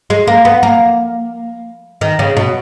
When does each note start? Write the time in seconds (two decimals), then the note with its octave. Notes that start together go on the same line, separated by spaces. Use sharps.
0.10 G#3
0.28 A#3
0.45 B3
0.63 A#3
2.01 D#3
2.19 C#3
2.37 B2